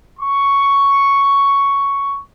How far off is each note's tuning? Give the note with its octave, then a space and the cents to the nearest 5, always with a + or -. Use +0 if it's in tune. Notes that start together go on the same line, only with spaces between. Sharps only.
C#6 +5